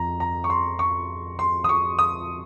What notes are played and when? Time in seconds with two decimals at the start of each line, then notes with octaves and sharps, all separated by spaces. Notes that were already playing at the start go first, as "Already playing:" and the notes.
Already playing: F2 F3 A#5
0.20 A#5
0.44 C#6
0.50 C6
0.79 C#6
1.39 C6
1.64 D#6
1.69 C#6
1.99 D#6